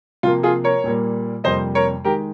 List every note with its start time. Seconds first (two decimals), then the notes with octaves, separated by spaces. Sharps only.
0.23 C3 F3 A#3 F4
0.43 F4 G#4
0.64 A#4 C#5
0.84 A#2 G3 A#3
1.44 F2 C3 G3 A#3 C5 D#5
1.75 A#4 C#5
2.04 D#3 G#3 G4 A#4